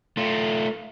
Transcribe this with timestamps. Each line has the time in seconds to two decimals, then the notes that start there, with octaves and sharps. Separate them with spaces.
0.17 A3 F4